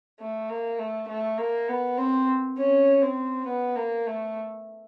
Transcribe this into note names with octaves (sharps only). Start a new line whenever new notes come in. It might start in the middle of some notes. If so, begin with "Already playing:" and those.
A3
A#3
A3
A3
A#3
B3
C4
C#4
C4
B3
A#3
A3